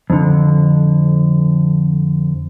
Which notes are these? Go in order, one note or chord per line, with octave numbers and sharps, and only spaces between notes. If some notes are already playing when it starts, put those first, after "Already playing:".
F2 D3